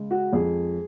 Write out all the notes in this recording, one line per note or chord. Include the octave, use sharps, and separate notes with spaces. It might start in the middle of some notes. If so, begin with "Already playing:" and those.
Already playing: C#3 G#3
F#4
F2 G#4